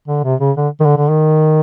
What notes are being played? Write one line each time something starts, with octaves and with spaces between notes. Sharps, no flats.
D3
C3
C#3
D3
D#3
D3
D3
D#3